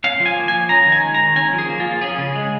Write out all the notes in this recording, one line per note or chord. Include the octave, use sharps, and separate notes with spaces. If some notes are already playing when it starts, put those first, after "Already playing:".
C#4 F5
F3
G#5
A#3
F3 G#5
C#4 A#5
D#3
G#5
G#3
D#3 A#5
C#4 G#5
F3
G#4
A#3
F4
F3
C#4 G#4
C#3
G#3